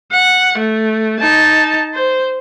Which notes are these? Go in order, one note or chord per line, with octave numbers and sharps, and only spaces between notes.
F#5
A3
D#4 A5
C5